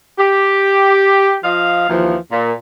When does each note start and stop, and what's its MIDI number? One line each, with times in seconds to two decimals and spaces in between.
0.19 1.38 67
1.44 1.87 53
1.44 1.87 65
1.44 1.87 75
1.44 1.87 77
1.89 2.17 39
1.89 2.17 52
1.89 2.17 53
2.32 2.53 46